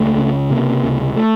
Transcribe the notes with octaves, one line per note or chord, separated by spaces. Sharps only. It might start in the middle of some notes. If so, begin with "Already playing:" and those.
Already playing: C#2 A3
C#3
C3 A#3
C#2
A3